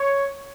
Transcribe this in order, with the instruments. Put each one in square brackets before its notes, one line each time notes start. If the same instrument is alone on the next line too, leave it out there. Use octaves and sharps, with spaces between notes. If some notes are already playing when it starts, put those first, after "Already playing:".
Already playing: [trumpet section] C#5